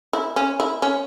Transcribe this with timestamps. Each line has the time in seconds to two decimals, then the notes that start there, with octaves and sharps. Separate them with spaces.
0.13 E4
0.36 C#4
0.60 E4
0.82 C#4